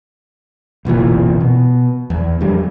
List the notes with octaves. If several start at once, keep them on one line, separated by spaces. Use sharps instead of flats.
F#1 B1 A#2 E3
B2
E2
F2 D3 G3